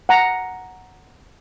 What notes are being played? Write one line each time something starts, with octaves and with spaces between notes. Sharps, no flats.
F#5 A#5